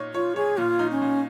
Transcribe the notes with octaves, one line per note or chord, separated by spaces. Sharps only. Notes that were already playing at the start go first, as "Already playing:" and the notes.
Already playing: A#2 D#4 C#5
F4 C#5
G#4 C#5
A#2 F4
D#4
C#4
A#2